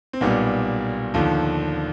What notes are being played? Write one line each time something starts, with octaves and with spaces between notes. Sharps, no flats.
C4
B1 A#2 G3 B3
D#2 D3 F3